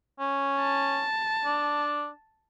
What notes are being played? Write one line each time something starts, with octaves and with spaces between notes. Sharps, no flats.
C#4
A5
D4